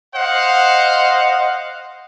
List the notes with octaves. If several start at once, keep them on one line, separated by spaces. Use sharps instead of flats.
C5 D#5 F5 F#5